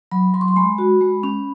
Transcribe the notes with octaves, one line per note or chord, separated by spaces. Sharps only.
F#3 B5
F#3 C6
C#6
C6
G#3 B5
F#4
G#3
C#4